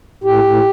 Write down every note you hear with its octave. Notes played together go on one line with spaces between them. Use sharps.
A2 G4
A2